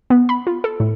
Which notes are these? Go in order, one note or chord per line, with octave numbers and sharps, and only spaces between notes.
B3
B5
F4
A4
A2